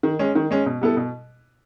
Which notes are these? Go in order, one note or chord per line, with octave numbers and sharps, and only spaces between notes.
D#3
G#3 C#4
D#3
G#3 C#4
B2
G3 B3 E4 A4
B2